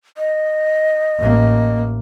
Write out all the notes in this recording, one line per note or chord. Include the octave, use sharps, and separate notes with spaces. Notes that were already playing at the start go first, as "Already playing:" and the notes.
D#5
A1 A#3